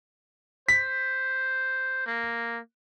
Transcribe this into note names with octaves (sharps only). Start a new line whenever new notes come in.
C5 B6
A#3